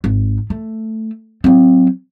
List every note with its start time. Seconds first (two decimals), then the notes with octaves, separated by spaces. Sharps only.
0.04 G#1
0.50 A3
1.44 F#3 C4